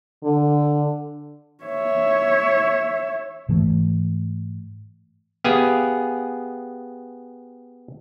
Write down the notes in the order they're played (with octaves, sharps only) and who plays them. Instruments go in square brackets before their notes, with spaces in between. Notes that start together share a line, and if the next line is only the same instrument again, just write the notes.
[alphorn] D3
[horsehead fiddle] C#5 E5
[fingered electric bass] G#2 E3 A3
[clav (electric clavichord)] B3 G4 G#4 F5 G#5